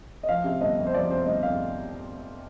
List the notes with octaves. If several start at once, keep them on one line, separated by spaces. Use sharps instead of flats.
D#5
F3 F5
C3
G1 D#5
F2
C5
F3 D5
C3 C5
G1 D#5
F2 F5